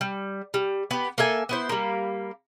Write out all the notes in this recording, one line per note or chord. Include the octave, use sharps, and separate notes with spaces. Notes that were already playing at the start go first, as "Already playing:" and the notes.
G3
G3
B3 G4
A#3 A4 E5 G#5
B3 E4 C5
G3 A#3